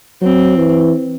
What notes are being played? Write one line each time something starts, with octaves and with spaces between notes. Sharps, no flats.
F#3 C4
E3